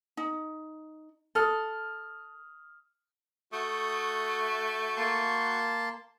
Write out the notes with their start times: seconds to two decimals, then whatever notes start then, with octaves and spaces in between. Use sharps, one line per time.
0.17 D#4
1.35 A4 D#6 F6
3.52 A3 F#4 C#6 D#6 G6
4.97 A#3 A5 C6